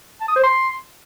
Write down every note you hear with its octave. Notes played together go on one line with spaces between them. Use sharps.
A5
D#6
C5
C6